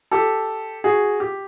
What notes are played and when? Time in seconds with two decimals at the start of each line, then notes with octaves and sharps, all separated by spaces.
0.11 G4 A4
0.84 F#4 G#4
1.20 G4